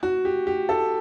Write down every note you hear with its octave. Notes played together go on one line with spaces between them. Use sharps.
F#4
G4
G4
A4